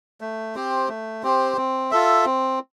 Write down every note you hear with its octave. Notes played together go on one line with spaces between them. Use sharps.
A3
C4 G4 C5
A3
C4 G4 C5
C4
F4 A4 E5
C4